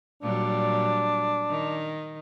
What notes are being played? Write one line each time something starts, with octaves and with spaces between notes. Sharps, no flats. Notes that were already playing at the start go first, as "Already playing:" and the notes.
A#2 F#3 G3 D4
D#3